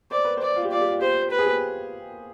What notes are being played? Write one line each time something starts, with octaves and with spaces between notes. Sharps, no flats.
C5 D5
B4
C5 D5
F4
G4
F4 D5
G4
F4
G4 C5
B4
G#4
G4